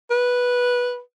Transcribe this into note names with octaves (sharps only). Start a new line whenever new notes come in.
B4